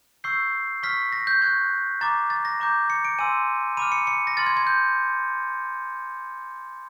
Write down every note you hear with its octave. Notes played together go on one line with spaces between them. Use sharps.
C#6 E6 G6 C7
C#6 F6 B6
A#6
G6
C#6 F#6 G#6
A#5 D6 G6 A6
A6
A#6
A#5 D6 G6
C#7
D7
G#5 C6 E6 D#7
B5 D6 F6 D#7
C#7
C#7
A#6
C6 F6 A6
G#6
G#6
G6